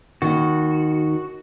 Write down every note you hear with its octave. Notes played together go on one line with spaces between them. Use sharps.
D#2 D#3 F#4